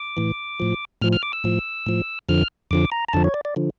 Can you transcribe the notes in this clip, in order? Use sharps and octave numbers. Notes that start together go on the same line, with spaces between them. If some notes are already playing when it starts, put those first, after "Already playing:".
Already playing: D6
A2 E3
A2 F3
A2 F3 F6
F6
D6
E6
A2 F3
A2 F3
F2 D3 F3 F6
F2 D3 F3 D6
A#5
A#5
F2 D3 F3 A5
C#5
D5
D5
D3 F3